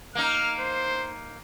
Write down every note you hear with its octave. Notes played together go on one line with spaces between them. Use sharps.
A#3 D#4 F6
C5